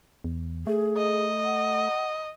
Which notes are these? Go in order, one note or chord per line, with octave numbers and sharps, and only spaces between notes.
E2
A3 G#4
D#5
F#5